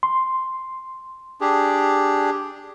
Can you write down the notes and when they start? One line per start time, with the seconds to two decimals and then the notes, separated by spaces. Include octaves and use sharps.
0.03 C6
1.41 D4 G4 G#4